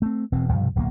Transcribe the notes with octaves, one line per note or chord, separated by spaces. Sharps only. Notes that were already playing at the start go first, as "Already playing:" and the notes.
A3 C4
E1 B2 E3 C4
B1 G2 C3 F3
D1 B1 C#3 A#3